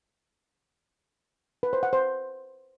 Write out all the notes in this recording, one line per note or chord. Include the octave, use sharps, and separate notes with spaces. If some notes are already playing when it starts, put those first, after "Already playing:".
B4
C5
F#5
C5